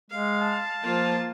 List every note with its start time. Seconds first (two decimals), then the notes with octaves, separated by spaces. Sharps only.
0.11 G#3 F5
0.41 A5
0.83 F3 A#3 F4